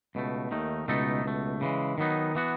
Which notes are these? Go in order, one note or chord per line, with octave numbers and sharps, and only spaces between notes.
C#2 B2 A3
D#2 D#3 A3 D#4
C#2 B2 A3 D#4 A4
C#2 B2 A3
C#3 E3 G#3
D#3 F#3 B3 D#4
E3 B3 F#4